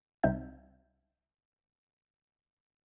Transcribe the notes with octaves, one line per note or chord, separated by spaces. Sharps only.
C2 G3 C4 D#4 E5 G6